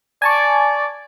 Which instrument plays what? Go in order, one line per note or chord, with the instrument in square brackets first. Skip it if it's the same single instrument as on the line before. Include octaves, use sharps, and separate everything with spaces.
[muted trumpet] D5 [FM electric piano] G#5 A5 C#6